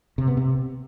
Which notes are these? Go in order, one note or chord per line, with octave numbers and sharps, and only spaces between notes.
C3
B3
C3